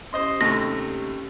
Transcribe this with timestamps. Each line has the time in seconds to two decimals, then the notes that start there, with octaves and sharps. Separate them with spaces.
0.13 C#4 G4 C5 D#5 C6
0.41 D#2 C3 A3 A#6